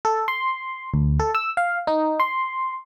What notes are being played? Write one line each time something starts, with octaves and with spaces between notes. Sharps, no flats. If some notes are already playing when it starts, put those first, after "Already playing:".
A4
C6
D2
A4
E6
F5
D#4
C6